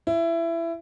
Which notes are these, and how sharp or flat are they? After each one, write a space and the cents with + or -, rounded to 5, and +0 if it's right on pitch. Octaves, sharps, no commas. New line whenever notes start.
E4 +20